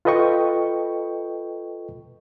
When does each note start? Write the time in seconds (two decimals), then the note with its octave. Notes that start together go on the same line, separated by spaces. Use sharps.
0.05 F4 A4 B4 D#5 G5 C#6